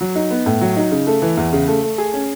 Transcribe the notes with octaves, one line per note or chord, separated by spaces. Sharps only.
F#3
D#4
B3
A2
F#3
D#4
C#3
A3
E3
E2
C#3
A3
A3
G#4
C#4